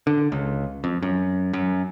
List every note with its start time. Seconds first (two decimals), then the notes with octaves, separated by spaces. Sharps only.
0.07 D3
0.32 C#2
0.84 F2
1.02 F#2
1.53 F#2